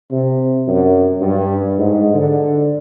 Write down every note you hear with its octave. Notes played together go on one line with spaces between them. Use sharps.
C3
F#2
G2
G#2
D3